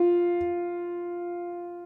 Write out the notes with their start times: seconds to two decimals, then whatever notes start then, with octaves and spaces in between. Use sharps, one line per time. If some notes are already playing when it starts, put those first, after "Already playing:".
Already playing: F4